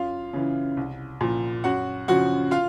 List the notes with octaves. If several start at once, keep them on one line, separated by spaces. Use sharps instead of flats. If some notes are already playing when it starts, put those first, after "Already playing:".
Already playing: F#2 F4 F5
C#3 E3
C2
A#2 F3
F#2 F#4 F#5
C#3 F3 F#4 F#5
F4 F5